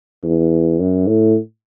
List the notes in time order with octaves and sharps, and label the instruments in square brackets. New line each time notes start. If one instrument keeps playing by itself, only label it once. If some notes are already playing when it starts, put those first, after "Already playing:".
[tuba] E2
F#2
A2